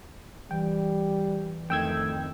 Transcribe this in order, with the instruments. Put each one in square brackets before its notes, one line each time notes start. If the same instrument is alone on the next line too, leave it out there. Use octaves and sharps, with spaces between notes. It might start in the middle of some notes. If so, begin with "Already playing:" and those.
[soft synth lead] E3 [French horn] G3 [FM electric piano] G5
[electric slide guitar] F2 D#3 [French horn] A3 [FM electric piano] G5 E6 G#6